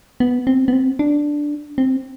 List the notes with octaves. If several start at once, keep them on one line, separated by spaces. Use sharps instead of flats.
B3
C4
B3
C4
D4
C4